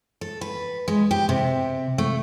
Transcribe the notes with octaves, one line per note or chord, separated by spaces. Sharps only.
A4
B4
G#3
G4
C3
A3